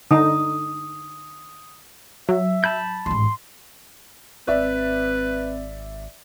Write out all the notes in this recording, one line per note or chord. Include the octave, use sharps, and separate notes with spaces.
D3 D#4 D#6
F#3 E5
A5 B5 G6
A1 G#2 C6
G#1 C4 B4 D5 E5